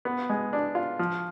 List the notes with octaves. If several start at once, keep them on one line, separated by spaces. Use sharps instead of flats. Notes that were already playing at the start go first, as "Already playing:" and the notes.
B3
G#3
D4
F4
F3